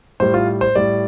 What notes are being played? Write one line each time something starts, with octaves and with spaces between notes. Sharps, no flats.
A2 G3 C5
F4
C5
A2 G3 D5